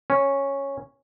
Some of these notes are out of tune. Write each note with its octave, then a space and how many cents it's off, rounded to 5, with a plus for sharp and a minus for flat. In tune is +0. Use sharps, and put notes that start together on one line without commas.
C#4 -5